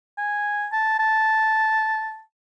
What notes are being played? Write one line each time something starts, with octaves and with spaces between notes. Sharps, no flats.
G#5
A5
A5